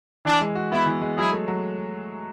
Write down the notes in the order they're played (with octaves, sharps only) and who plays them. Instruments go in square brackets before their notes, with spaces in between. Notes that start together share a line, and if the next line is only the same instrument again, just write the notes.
[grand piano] E3 [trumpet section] D4
[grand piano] G#3
F#4
[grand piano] B3 [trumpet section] E4
[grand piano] E3
G#3
[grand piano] F#3 [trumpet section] E4 G#4
[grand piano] A3
F#3